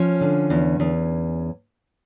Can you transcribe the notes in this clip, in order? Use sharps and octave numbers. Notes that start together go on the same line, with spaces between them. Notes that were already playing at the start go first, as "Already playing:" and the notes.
Already playing: F3 C#4
D3
E2
E2